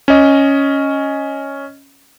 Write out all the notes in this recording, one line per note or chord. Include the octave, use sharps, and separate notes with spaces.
C#4 D#5